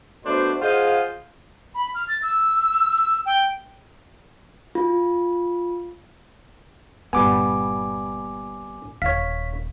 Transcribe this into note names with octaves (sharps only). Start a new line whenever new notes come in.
B2 A3 D4 C5
F4 G#4 C5 D#5 F5 F#5
B5
F6
A6
E6
G5
F4
G1 A#2 G3 B3 G#5 D6
D#1 C#4 C#5 F5 B6